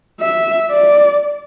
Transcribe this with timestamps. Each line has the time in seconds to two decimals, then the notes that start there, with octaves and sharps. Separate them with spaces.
0.21 E5
0.70 D5